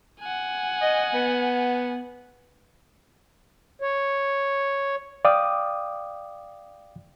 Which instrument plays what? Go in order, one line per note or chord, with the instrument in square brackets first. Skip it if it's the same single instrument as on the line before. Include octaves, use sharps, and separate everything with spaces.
[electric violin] F#5 G#5
[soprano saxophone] D#5
B3
[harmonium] C#5
[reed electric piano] D5 F5 G5 D6 D#6